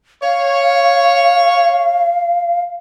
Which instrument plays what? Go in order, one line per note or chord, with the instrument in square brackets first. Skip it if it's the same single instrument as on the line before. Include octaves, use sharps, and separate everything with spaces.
[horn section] C#5 [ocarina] F5